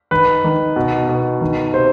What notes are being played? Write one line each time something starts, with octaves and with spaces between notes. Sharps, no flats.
D#3 B4
D#3
B2
B2
D#3
C3 C5